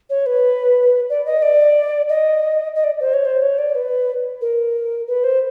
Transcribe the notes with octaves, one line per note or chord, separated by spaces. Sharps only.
C#5
B4
D5
D#5
D5
D#5
D#5
D5
C5
C#5
C5
C#5
D5
B4
A#4
B4
C5